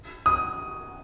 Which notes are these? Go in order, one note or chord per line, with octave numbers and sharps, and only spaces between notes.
D#6